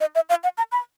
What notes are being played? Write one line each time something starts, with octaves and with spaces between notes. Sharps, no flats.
D#5
E5
F5
F#5
A#5
B5